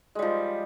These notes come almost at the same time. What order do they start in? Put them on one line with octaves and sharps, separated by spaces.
G#3 G3 F3